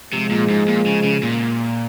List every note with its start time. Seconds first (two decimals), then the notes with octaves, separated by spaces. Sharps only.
0.13 C3 F3 G#3
0.31 A#2
0.50 G#2
0.68 A#2
0.86 C#3
1.04 C#3
1.23 A#2